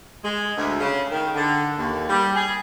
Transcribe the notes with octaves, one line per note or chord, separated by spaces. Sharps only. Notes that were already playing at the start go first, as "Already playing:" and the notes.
G#3
D2
C#3
D#3
D3
D#2
G3
G#4